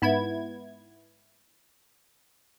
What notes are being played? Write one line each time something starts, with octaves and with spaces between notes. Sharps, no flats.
G#2 B3 E4 G#6